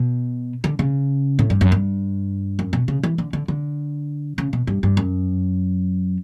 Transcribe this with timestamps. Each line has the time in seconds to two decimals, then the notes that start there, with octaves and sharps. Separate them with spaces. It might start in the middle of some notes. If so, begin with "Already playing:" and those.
Already playing: B2
0.64 D3
0.79 C#3
1.39 A2
1.50 G2
1.61 F#2
1.72 G2
2.59 F#2
2.73 B2
2.88 C#3
3.03 E3
3.18 D3
3.33 D3
3.48 D3
4.38 C#3
4.53 B2
4.67 G2
4.83 G2
4.97 F#2